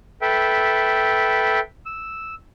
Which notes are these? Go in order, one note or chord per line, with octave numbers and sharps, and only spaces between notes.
A4 B4 E5 G5
E6